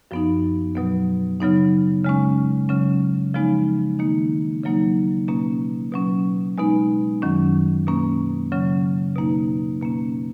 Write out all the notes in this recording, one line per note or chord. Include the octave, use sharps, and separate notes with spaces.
F#2 F3 B3 D#4
B2 F#3 B3
C#3 F#3 B3 D#4
C#3 G#3 C#4
C#3 F#3 C#4
C#3 F3 G#3 B3 D#4
D#3 A#3 D#4
C#3 F#3 A#3 D#4
B2 A#3 C#4
B2 F#3 C#4
B2 G#3 B3 D#4
F#2 D#3 F#3 C#4
B2 A#3 C#4
C#3 F#3 C#4
B2 A#3 D#4
B2 A#3 C#4